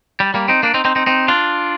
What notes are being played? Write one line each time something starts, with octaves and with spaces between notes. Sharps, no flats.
G3
G3 A#3
C4 D#4
A#3 D4
C4 D#4
C4 D#4
C4 D#4
C4 D#4
D4 F4